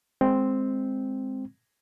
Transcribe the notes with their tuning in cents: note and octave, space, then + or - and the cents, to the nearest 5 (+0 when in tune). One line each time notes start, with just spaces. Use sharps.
G#3 +0 C4 +0